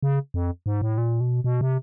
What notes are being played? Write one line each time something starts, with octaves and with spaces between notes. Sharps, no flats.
C#3
F2
G#2
A2
A#2
B2
B2
C3